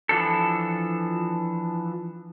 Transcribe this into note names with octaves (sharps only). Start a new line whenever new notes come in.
E3 F3 D4 A4